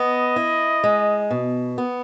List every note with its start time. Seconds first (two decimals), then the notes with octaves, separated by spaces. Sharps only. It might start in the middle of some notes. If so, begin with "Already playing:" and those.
Already playing: B3 D#5
0.36 E4
0.84 G#3
1.31 B2
1.78 B3